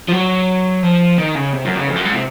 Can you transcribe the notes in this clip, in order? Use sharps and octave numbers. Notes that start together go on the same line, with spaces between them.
F3
F#3
F3
D#3
C#3
C3
F#2
C#3
F2
F#2
G#2
C3